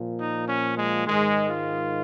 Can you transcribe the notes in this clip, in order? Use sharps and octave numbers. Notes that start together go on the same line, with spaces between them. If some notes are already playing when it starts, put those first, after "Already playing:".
Already playing: A#2 F3
D#4
C#4
G#3
G#2 D#3 G#3
F4